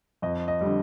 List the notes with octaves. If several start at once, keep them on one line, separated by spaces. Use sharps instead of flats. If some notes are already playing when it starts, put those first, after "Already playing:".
F2 D#5
D#5
D3 G3